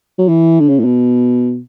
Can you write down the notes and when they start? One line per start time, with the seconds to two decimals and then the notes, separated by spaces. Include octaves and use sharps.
0.19 F#3
0.28 E3
0.60 D3
0.69 C#3
0.80 A2
0.85 B2